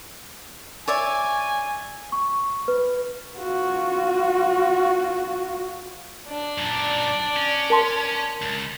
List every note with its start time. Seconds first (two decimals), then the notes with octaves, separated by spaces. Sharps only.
0.88 C#5 D5 E5 G#5
2.12 C#6
2.68 B4
3.37 F4 F#4
6.28 D4 D5
6.58 F#2 A#2
7.37 C#4
7.70 A#4 A5 C6
8.42 C#2